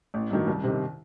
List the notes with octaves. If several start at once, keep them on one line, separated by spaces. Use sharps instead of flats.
A1
G2 D#3 F#3
C2
C3 D#3